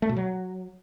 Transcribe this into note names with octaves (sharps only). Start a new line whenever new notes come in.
A3
B2
F#3